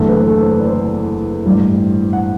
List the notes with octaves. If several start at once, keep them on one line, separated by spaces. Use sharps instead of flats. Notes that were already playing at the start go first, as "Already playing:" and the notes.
Already playing: F#1 E2 D3 A3 A4
B4
B4
A4
C5
B4
D5
C4 C5
A1 G2 E3 G3
F#5